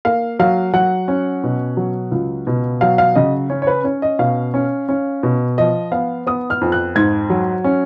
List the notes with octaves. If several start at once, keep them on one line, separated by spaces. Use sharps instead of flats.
A#3 F5
F#3 F5
F#3 F#5
C#4
B2
F#3
C#2
B2
F#3 F5
F5
C#3 D#5
C#4 C#5
C#5
B4
C#4 C#5
D#5
B2 F5
C#4
C#4
B2
F3 D#5
B3 F5
B3 D#6
F6
F2
F#6
G#2 G#6
F#3
C#4